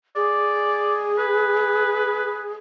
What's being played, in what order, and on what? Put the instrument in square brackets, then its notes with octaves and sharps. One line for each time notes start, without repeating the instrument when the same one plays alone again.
[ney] G#4 [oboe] D5
[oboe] B4